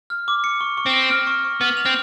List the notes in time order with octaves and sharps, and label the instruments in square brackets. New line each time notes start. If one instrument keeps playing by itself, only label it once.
[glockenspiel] F6
D6
C#7
C#6
C#6
[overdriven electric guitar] C4
[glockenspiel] A#6
F6
C#6
C#6
[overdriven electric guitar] B3 [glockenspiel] F6
[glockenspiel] F7
[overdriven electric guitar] C4